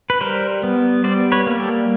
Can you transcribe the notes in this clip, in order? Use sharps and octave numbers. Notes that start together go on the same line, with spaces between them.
B4
G3 A#4 C5
B3
G3 C5 D5
B4 C#5
A#3
G4 A4